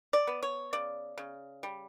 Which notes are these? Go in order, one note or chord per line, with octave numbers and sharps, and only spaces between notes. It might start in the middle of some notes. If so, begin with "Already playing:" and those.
D5
B3
C#5
C#3 D5
C#3
G3